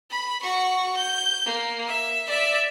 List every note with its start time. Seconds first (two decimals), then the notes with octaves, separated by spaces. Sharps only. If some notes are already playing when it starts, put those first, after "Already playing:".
0.10 B5
0.43 F#4 C#6
0.97 G6
1.45 A#3
1.87 E5
2.27 D5 E5